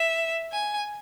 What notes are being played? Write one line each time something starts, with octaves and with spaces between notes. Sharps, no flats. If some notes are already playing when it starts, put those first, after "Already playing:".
Already playing: E5
G#5